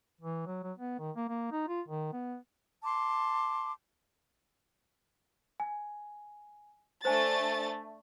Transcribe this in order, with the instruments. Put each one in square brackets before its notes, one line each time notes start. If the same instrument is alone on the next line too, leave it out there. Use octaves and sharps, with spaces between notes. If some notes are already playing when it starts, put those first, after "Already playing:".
[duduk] E3
F#3
F#3
B3
D#3
A#3
A#3
D#4
F4
D#3
B3
[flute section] A5 C6 D6
[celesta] G#5
[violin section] A3 D4 A6 [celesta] C5 G#5